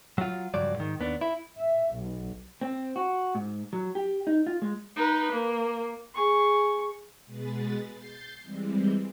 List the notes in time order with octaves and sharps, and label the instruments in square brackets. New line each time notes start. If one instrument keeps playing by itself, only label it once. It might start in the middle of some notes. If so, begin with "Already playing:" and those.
[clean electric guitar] F#3 F4
C#2 G2 F3 F#3 D5
G#2 D#3
D#2 B3 D4
E4
[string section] E5
B1
[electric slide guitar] C4
F#4
G#2
F#3
G4
D#4
F4
G#3
[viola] D#4 B4
A#3
[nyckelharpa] G#4 C#6
[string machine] B2 G#3 G#4 B4 A6
G6 A6 C7
E3 G3 G#3 C4